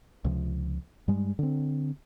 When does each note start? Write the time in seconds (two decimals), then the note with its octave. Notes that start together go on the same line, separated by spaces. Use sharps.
0.25 C#2 C3 F3
1.08 G2 G3 G#3
1.39 D3 C4